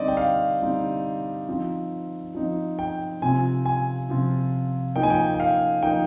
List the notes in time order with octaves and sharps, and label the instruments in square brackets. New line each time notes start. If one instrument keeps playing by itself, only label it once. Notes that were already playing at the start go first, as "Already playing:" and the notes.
Already playing: [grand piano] D3 G3 C4 D#4 D5 D#5
G5
F5
D3 G3 C4 D#4
F3 C4 D#4
F3 C4 D#4
G5
C3 F3 C4 F4 G#5
G#5
C3 F3 C4 F4
F3 A#3 D#4 G5
G#5
G5
G5
F5
F3 A#3 D#4 G5